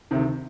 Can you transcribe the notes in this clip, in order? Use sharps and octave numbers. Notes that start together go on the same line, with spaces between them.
D2 C3 D#3